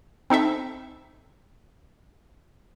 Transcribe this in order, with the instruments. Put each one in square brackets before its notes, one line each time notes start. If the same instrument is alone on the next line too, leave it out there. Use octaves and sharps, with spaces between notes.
[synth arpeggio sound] C4 D#4 A4 E5